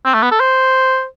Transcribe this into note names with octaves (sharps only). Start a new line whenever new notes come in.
C4
A3
B3
A4
C5